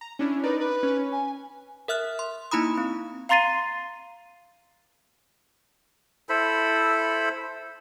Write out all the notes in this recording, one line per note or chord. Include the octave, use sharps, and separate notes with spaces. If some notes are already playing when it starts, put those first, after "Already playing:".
A#5
C#4 D4 E4
D#4 A#4 B4 D5
B4
C#4
G#5
A#4 E5 F6 F#6
C6
A#3 D#4 E4 A#5 B5 D#6
C4
F5 A#5 C6 A6 C7 D#7
E4 A4 C5 B5